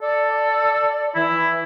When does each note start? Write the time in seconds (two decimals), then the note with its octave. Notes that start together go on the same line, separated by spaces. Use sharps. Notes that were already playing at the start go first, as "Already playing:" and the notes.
0.02 A4 D5
1.15 E3 E4